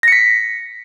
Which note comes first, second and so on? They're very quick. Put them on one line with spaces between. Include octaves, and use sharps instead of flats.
A#6 C#7 B6